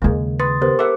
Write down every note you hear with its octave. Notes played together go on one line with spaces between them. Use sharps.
D#2 C#3 G#3 A#3
B4 C6 D#6 A6
B3 G4 A#4 C5
A4 A#4 E5 F#5 D6